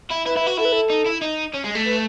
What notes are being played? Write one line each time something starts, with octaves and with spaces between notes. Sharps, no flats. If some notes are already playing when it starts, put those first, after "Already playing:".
E4
E4 B4
E4 B4
F#4
E4 A4
B4
A4
D#4
E4
D#4
C#4
G#3
A3
B4